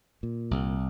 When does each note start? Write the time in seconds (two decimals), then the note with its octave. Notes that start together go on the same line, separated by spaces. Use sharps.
0.23 A#2
0.51 C2